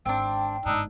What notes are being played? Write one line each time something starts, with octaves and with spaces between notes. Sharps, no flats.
G#1 C4 D4 G5
G1 G#2 D4 D#4 E6